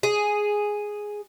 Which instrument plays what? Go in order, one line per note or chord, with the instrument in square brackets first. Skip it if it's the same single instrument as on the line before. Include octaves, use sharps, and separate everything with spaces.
[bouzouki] G#4